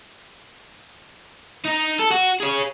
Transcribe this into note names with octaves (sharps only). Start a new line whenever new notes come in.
D#4
A4
F#4
G#4 C#5